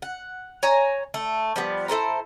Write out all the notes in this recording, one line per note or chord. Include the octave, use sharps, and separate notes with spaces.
F#5
C#5 G#5 A#5
A3
F3 G3 B3
E4 A4 C5 A#5